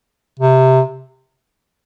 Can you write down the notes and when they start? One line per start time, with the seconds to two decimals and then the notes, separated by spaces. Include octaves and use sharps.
0.39 C3